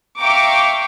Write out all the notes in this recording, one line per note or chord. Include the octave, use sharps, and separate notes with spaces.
E5 F5 G5 A#5 C#6 D6